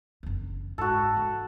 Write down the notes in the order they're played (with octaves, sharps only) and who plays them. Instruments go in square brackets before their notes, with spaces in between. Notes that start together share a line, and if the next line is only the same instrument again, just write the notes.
[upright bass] F#1 E2
[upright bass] G#2 [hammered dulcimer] F#4 A4
[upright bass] E3